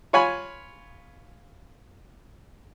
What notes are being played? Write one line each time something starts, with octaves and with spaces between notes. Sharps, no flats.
F4 C#5 G#5 B5